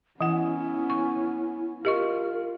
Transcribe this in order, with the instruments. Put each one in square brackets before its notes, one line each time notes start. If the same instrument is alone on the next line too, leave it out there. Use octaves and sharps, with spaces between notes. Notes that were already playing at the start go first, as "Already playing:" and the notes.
[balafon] E3 F#5 [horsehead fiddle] B3 C#4 [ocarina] E4
[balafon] C#6
[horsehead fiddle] F4 [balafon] G4 D#5 C#6 [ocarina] A#4